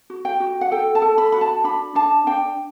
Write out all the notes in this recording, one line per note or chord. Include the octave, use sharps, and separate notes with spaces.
F#4
G5
F#4
F#5
A4 G5
A5
A4
B5
F#4 B5
A5
D4 B5
D4 A5
D4 G5